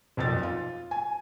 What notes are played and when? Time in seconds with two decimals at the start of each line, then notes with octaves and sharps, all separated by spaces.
0.17 B1 F2 A#2 A6
0.43 F4
0.91 G#5